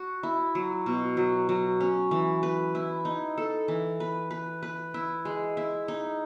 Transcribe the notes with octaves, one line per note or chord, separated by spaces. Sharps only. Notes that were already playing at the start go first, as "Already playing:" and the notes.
Already playing: F#4
E4
F#3
B2
F#3
F#3
C#4
E3
B4
E4
D#4
A4
E3
B4
B4
B4
E4
G#3
E4
D#4